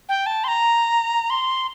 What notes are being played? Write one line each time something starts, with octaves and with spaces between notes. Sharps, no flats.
G5
A5
C6
A#5
C6